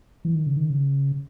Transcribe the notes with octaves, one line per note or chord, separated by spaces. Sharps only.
E3
D#3
C#3
D#3
C#3